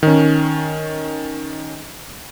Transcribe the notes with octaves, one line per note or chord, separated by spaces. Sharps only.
D#3 C#4